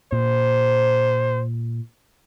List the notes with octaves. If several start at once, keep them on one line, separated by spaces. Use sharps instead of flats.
A#2 C5